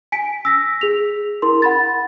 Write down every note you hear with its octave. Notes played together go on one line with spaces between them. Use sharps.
G#5 B6 D7
E6 A#6 B6
G#4 F7
E4 A#4 C6
F#5 B5 A6